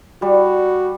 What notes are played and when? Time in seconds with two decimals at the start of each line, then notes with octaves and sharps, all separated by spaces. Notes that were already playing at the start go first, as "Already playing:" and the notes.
0.22 G3 F#4